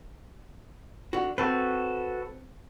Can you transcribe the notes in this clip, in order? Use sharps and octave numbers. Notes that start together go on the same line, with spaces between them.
D3 F#4
C4 F#4 A4 B4